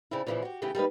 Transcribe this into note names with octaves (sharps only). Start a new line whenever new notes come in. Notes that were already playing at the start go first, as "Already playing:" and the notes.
C#3 C4 D4 E4
A#2 C#3 E3 F3 C#4 E4
F#4 G4
C#3 E3 A3 B3 E4 G4
G3 A#3 D#4 B4